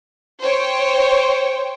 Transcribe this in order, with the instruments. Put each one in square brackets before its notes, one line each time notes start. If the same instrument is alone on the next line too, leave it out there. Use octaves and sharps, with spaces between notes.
[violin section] C5 C#5 G5